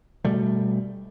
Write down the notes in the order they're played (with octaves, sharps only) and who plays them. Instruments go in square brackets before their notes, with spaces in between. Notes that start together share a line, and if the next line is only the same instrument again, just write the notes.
[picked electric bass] B2 G3 A3